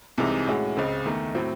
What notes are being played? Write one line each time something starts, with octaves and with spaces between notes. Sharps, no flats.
C2 C3 E3 G#3 D#4
A2 G#3 C#4 F#4
C#2 C#3 G#3 C4
E2 D#3 A3
A2 F#3 C4